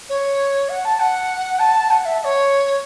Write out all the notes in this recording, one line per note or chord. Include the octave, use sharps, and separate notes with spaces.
C#5
F#5
A5
F#5
A5
F#5
E5
E5
C#5